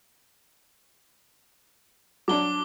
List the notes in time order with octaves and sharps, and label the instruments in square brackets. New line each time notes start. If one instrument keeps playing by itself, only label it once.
[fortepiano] F#3 D4 [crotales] D6 G7